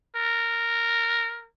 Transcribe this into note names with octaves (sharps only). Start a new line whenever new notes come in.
A#4